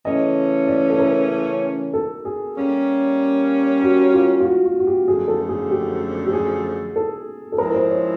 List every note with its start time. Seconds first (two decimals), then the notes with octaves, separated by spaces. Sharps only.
0.05 C#3 E3 A3 C#4 D#5
0.68 D5
0.90 A4
0.99 A#4
1.94 A4
2.25 G#4
2.57 G3 A#3 C#4
3.82 F#4
4.13 F4
4.40 F4
4.45 F#4
4.65 F#4
4.79 F#4
4.87 G4
5.08 F#2 D3 F3 A3 D4 G#4
5.28 A4
5.49 G#4
5.70 G4
6.26 G4
6.33 G#4
6.96 A4
7.52 A4
7.58 F3 G#3 C4 E4 A#4
7.74 C5
7.90 C#5